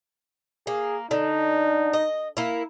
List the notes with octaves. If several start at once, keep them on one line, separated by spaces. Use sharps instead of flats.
A#3 G#4
D3 D#4
D#5
A#3 E4